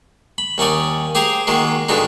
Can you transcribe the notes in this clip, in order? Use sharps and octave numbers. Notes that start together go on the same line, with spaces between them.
B5
D#2 C#4 D#4 D5 G#5
G4 G#4 C5 G#5 A#5
D#3 F#3 G#3 A#3
G2 B2 D3 F#3 G#3 D#4